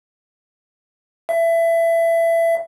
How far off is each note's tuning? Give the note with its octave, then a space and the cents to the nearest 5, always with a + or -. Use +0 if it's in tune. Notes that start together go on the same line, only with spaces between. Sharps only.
E5 +20